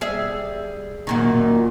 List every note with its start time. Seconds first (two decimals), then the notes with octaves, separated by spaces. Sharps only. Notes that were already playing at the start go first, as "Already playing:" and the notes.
0.01 G3 G#4 E5
1.07 F#2 A#2 D#3